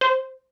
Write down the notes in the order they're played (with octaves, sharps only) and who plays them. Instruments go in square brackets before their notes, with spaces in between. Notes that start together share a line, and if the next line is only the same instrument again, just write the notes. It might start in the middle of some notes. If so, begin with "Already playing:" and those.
[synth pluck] C5